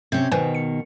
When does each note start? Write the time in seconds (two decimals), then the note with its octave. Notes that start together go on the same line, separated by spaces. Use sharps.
0.12 C3 C#4 G6
0.32 B2 D#3 B4 C5 G#5
0.54 C#7